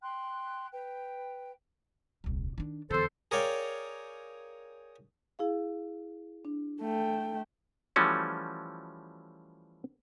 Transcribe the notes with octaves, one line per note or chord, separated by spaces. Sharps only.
G5 C6 F#6
B4 G5
D#1 C2
D#3 D4
E2 D3 A4 C5
G#4 A#4 C#5 D5 F5 G5
E4 G#4 F5
D4
A3 G5
E3 F3 G3 A3 C#4 F#4